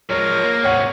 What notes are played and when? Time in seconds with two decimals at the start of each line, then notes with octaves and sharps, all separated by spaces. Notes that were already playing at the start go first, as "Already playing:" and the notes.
0.10 F3 G#3 A#4 C#5
0.44 A#3
0.64 G#2 C3 C#5 F#5